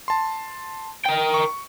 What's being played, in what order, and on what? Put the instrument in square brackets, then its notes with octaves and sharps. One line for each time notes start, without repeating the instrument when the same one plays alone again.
[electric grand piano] A5 C6
[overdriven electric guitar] A#4 G5
[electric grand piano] C#6